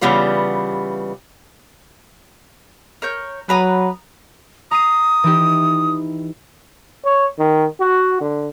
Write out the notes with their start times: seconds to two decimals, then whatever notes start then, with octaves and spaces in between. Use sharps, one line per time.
0.01 C#3 E3 G3 B3 F4 B4
3.02 A#4 C#5 G6
3.49 F#3 B4 A#5 D#6
4.71 A#5 D#6 C7 D#7
5.24 E3 D#4 G4
7.05 C#5
7.39 D#3
7.81 F#4
8.21 D3